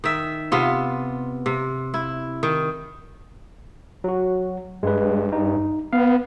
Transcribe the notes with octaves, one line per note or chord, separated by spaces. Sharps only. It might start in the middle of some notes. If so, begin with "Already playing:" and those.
D#3 E5
C3 B3 F4
C3
E4
D#3
F#3 F#4
G2 G#3 B4
D#4
B3 F5